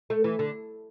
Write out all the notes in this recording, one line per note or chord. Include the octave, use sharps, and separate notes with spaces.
A3
E3
D3